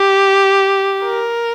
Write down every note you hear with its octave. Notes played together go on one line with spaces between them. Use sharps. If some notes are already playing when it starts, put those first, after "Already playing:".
Already playing: G4
A#4